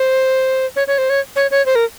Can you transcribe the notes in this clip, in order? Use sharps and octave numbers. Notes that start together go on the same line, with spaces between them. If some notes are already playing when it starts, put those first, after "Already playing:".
Already playing: C5
C#5
C#5
C5
C#5
C#5
C#5
C5
A#4